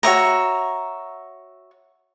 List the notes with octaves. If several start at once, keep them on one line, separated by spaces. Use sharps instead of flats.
F#4 C#5 E5 A#5